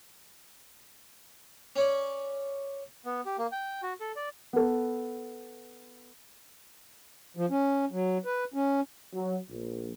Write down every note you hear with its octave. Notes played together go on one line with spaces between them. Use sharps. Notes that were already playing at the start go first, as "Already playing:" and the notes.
C#4 C#5 D5
B3
G4
A#3
G5
F#4
A4
D5
B3 A4
F3
C#4
F#3
B4
C#4
F#3
A#1